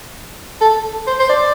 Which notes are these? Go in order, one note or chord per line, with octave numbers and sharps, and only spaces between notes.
A4
C5
C5
D5